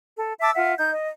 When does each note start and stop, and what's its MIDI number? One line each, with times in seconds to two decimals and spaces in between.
0.17 0.33 69
0.41 0.50 76
0.41 0.50 81
0.41 0.50 86
0.41 0.50 88
0.54 0.73 65
0.54 0.73 76
0.54 0.73 78
0.78 0.89 63
0.78 0.89 91
0.93 1.08 75